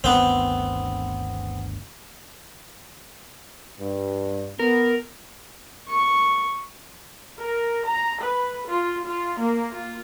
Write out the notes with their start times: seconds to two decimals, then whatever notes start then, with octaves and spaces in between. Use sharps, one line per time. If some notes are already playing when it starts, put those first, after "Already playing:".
0.04 G1 D2 D#3 B3 C4
3.80 G2
4.59 B3 A#4
5.89 C#6
7.41 A#4
7.86 A#5
8.22 B4
8.68 F4
9.07 F4
9.39 A#3
9.72 F4